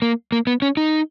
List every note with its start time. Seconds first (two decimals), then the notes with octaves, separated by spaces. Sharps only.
0.02 A#3
0.32 A#3
0.47 B3
0.62 C#4
0.77 D#4